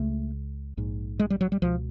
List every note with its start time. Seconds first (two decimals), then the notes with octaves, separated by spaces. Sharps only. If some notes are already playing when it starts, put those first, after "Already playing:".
Already playing: C#2 C#3 A3
0.77 A#1 G#2
1.19 G#3
1.30 G3
1.41 F#3
1.52 G3
1.62 C#2 B2 F3